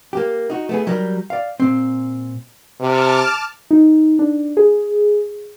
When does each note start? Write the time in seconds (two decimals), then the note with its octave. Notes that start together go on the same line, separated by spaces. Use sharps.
0.13 A#3 G4
0.50 D#4 F#4
0.69 A3 B3 G#4
0.87 F#3 G3 G4 A#4
1.30 D5 F5
1.60 A#2 C4
2.80 C3 A5 D6 F6
3.71 D#4
4.19 D4
4.57 G#4